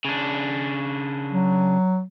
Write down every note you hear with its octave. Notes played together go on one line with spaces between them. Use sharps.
C#3 D4
F#3